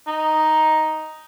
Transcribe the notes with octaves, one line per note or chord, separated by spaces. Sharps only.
D#4